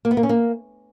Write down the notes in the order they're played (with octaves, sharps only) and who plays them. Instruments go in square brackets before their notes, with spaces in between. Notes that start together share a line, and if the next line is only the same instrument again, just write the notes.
[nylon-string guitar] A#3
B3
A#3
C#4
A#3